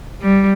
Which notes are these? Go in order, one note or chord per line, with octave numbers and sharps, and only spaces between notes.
G3